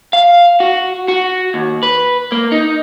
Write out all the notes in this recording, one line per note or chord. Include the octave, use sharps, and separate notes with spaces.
F5
F#4
F#4
D#2
B4
A#3
D#4